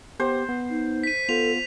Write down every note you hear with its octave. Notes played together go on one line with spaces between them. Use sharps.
B3 G4 C5
B3
D#4
B6 D#7
B3 F4 A4 F7